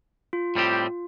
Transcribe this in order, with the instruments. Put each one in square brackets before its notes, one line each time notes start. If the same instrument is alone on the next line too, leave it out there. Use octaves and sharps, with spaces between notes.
[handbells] F4
[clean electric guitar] A2 G3 C4 G4